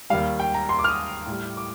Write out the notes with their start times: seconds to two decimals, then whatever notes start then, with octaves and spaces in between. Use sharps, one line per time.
0.10 D#2 D#3 G3 F5
0.40 G5
0.54 A#5
0.69 C6
0.79 D6
0.84 F6
0.88 D#6
1.27 A2 G3
1.57 D6